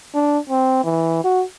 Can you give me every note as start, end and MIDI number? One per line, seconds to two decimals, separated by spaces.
0.15 0.38 62
0.49 0.80 60
0.84 1.23 52
1.24 1.44 66